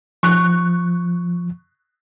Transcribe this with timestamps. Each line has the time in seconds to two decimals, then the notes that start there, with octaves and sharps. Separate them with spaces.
0.23 F3 C#6 F#6